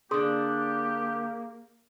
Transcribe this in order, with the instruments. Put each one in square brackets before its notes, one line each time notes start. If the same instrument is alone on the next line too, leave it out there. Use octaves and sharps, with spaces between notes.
[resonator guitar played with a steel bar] D3 D4 [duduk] A#3 [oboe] G4 [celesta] G#4 C6 D#6